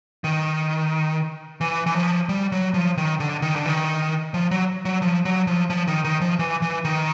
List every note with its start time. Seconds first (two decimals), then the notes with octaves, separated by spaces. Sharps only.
0.24 D#3
1.61 E3
1.86 E3
1.95 F3
2.29 G3
2.52 F#3
2.74 F3
2.97 D#3
3.20 D3
3.42 D#3
3.56 D3
3.65 D#3
4.34 F3
4.51 F#3
4.85 F#3
5.02 F3
5.25 F#3
5.47 F3
5.70 F3
5.87 D#3
6.04 D#3
6.21 F3
6.39 E3
6.62 E3
6.85 D#3